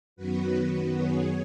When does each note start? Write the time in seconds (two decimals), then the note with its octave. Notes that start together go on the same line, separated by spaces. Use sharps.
0.16 F#2 D#3 F#3 B3 F#4 B4
0.97 G#4 C#5